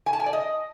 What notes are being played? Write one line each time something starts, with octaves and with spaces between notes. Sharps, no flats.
G#5
A5
G#5
D5
D#5